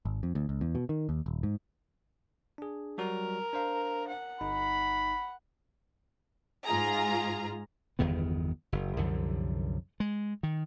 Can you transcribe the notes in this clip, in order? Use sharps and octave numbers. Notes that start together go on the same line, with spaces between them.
G#1
F2
D2
C#2
E2
B2
D#3
D#2
D#1
G#2
D4 G#4
F#3 G3 F#4 A#4
D4 C5 F5
F#5
G1 D#4 B5
G#2 F4 G#4 A#5
G1 E2 D#3 B3
F#1
C2 F#2 D3 F3
G#3
D#3